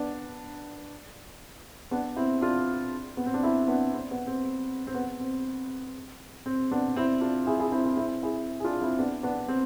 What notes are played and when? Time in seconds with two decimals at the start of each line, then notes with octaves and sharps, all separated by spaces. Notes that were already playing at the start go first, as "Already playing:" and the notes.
Already playing: B3 D4
1.91 B3 D4
2.16 C4 E4
2.42 D4 F4
3.17 B3
3.26 C4
3.34 D4
3.43 C4 E4
3.68 B3 D4
3.94 C4
4.11 B3
4.27 C4
4.87 C4
4.94 B3
5.20 C4
6.46 C4
6.71 B3 D4
6.96 C4 E4
7.21 D4 F4
7.47 E4 G#4
7.59 E4 G#4
7.72 C4 E4
7.85 C4 E4
7.97 C4 E4
8.23 E4 G#4
8.60 G#4
8.64 D4 F4
8.81 C4 E4
8.99 B3 D4
9.23 B3 D4
9.48 C4